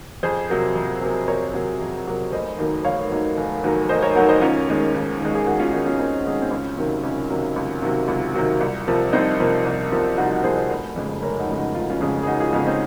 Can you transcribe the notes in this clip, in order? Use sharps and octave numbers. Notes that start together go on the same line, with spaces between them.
F2 G#4 C5
C3 F#3 A#3
F2
C3 F#3 A#3
F2 A#4 C#5
C3 F#3 A#3
F2
C3 F#3 A#3
F1 C5 D#5
D#2 D#3 F#3 A#3
F1 C#5 F5
D#2 D#3 F#3 A#3
F1
D#2 D#3 F#3 A#3
F1 C5 D#5
A#4 C#5
D#2 D#3 F#3 A#3 F#4 A#4
C5 D#5
D#2 C#4 F4
D#3 G#3
D#2
D#3 G#3
G#4
D#2 F#4
C#4 F4
D#3 G#3 D#4 F#4
C#4 F4
D#2 C4 D#4
D#3 G#3
C4
C#2 C#4
C3 D#3 F#3 A#3 C4
C#2 C#4
C3 D#3 F#3 A#3
C#2
C3 D#3 F#3 A#3
C#2
C3 D#3 F#3 A#3
C2
C3 F3 A#3
C2 C4 D#4
C3 F3 A#3
C2
C3 F3 A#3
C2 D#4 F#4
D#4 F#4
C3 F3 A#3 G#4 C5
C5 D#5
F1
F2 C#3 G#3
F1 A#4 C#5
D#4 F#4
F2 C#3 G#3
D#4 F#4
F1 F4
F#4
C#4 F4
F2 C#3 G#3 F4 G#4
G#4
F1 D#4 F#4
F4 G#4
F2 C#3 G#3 C#4 F4
C4 D#4